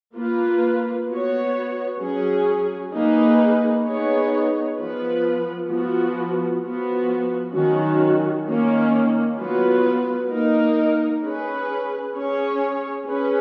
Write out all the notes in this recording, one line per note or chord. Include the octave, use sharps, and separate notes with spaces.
A#3 F4 B4
B3 F#4 C#5
F#3 C#4 G#4
A#3 D#4 G#4 B4
B3 D#4 G#4 C#5
F3 B3 F4 B4
F3 B3 F#4
F3 B3 F#4
D#3 F#3 C#4 F#4
D#3 A#3 C#4
F#3 B3 F4 B4
A#3 D#4 A#4
C#4 G#4 B4
C#4 G#4 C#5
C#4 G#4 B4